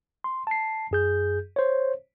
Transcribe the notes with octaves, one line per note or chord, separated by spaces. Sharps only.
C6
A5 C7
F#2 G#4 G6
C5 C#5